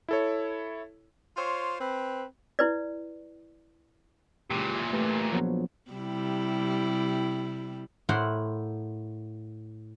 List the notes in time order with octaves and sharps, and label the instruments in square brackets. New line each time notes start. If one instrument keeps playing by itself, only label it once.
[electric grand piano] E4 A4 C#5
[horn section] F4 C5 C#5
C4 B4
[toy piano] E4 B4 D5
[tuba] C#2 [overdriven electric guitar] A#2 E3 [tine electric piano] G4
[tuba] A3 [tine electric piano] G4 B4
[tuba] A#1 [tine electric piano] F3 F#3 B3
[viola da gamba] C3 G3 E4
[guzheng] A2 E4 A#4 C5 F#5 C6